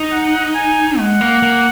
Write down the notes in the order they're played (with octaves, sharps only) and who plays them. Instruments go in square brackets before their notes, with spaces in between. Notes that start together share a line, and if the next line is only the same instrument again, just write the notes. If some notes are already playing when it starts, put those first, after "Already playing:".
Already playing: [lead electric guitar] D#4
[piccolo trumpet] F#5
G#5
[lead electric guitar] G#3 [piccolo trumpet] F#5
[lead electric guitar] A#3
A#3